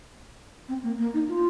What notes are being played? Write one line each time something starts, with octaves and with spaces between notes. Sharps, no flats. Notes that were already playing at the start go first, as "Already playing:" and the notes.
C4
A#3
A#3
D#4
F4